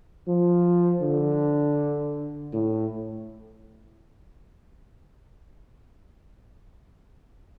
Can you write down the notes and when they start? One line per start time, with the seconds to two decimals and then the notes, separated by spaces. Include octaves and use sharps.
0.28 F3
1.02 D3
2.53 A2